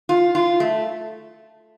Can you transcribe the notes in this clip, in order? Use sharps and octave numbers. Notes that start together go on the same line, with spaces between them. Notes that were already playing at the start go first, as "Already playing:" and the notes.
F4
F4
A3